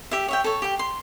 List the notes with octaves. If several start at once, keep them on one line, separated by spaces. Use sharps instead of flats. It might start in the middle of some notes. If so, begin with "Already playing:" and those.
G4 E5
C#5 E5 G5
A4 C#5
G4 G5
C6